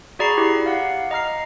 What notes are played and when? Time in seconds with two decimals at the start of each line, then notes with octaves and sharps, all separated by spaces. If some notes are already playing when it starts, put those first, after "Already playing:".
0.19 F#4 G#4 D5 A#5 B5 C7
0.38 E4 G4
0.66 F5 F#5
1.11 D#5 A#5 F6 C7